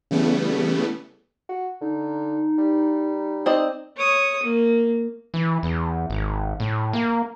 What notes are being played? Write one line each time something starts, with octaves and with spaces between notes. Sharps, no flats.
C#3 E3 G3 A3 B3
F#4
D3 D#4
G3
C4 D5 D#5
C#5 D#6
A#3
E3
E2
G#1
A2
A#3